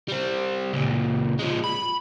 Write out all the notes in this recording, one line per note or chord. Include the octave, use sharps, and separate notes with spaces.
G3 C4
C#2 A#2
F3 G#3
B5